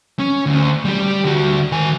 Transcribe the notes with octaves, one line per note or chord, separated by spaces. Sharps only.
C#4
D2
G3 G4
D3 F#4
D#3 G#5